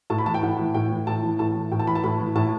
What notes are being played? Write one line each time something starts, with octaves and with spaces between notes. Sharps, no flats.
A2 A5
B5
E3 A5
G5
A2 F#5
E3
A2 G5
E3
A2 A5
E3
A2 A5
E3
A2 G5
A5
E3 B5
A5
A2 B5
E3
A2 A5